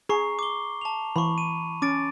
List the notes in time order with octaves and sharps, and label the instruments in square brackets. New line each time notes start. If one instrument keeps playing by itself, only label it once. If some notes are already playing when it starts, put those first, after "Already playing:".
[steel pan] G#4 [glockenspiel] A#5 C#6 C7
[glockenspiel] D6 G7
A5 F7
[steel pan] E3 [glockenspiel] B5 C#6
[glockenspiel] D#7
[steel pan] C#4 [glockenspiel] D6 A6 D7